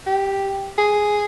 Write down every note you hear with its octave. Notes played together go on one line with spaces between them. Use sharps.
G4
G#4